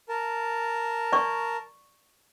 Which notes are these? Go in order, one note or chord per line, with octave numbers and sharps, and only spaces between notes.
A#4 A5
D5 C#6